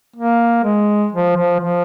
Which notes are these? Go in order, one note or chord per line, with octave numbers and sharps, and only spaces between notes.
A#3
G#3
F3
F3
F3